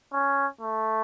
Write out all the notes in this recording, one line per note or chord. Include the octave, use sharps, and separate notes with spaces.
C#4
A3